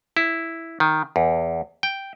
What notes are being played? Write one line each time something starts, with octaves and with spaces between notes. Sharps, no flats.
E4
D#3
E2
G5